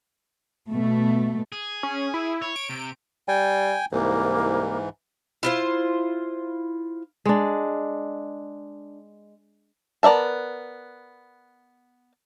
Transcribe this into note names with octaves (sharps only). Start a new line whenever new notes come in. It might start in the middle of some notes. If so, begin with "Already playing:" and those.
B2 A3
G#4
C#4
E4
C#5
D7
C3
G3 G5 G#5
C2 G#2 E3 A#3
E4 F4 C5
G#3 D4
B3 A#4 D5 E5 A5